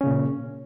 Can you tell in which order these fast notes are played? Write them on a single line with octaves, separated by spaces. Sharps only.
C#4 C#3 A#2